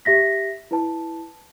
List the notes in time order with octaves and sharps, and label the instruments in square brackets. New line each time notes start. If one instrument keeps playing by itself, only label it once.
[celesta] G4 E5 A#6 B6
E4 B4 A5